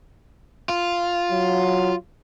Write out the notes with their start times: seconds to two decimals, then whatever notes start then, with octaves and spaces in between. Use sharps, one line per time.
0.69 F4
1.31 F#3